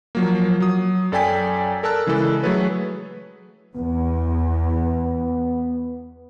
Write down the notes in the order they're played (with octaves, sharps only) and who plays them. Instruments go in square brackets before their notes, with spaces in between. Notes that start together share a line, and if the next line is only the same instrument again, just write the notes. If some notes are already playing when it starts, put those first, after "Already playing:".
[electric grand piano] F3 F#3 A#3
F#3 D#6
F#2 A4 D5 G5 G#5 B6
A4 A#4 D5 A5 E6 F#6
C#3 E3 G#3 E4 A4
F#3 A3 G#4 A4 B4 C#5
[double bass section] E2 [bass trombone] B3